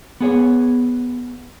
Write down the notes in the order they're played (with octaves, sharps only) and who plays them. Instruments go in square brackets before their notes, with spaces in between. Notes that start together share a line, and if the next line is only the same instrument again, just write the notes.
[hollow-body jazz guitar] B3 G#4 C#5